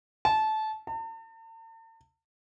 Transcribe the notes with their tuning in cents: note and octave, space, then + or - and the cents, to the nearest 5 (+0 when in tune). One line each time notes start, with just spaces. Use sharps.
A5 -20
A5 +45